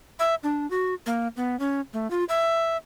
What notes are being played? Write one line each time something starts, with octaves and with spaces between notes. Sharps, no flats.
E5
D4
F#4
A#3
B3
C#4
A3
F4
E5